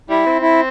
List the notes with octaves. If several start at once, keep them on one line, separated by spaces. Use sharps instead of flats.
G3 E4
C4
E4